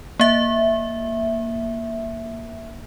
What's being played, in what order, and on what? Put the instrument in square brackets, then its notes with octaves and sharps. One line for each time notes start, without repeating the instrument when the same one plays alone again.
[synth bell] A#3 E5